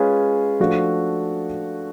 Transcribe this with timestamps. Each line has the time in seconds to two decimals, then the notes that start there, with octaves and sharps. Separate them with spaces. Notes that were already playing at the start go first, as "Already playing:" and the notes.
Already playing: G#3 C#4 F4 G#4 B4
0.60 F3 A3 D4 F#4 A4